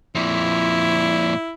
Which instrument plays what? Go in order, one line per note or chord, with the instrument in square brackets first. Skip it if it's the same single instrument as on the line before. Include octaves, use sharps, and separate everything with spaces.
[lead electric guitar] F2 A#2 [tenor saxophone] E4